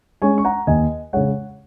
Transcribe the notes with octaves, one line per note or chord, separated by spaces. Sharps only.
G#3 C#4 G#5 C#6
C#6
F#5 A#5
D#2 D#5 G#5
C#3 G#3 C#5 F#5